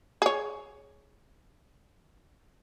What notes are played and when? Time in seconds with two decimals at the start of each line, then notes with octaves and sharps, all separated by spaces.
0.22 G#4 C#5